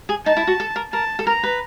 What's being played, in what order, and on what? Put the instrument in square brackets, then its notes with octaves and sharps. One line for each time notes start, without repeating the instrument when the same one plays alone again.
[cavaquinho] G#4
[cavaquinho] D#4 [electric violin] A5
[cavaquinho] E4
F#4
A4
A#4
[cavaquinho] A#4 [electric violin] A5
[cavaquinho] A4
[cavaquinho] A#4 [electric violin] A#5
[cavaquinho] B4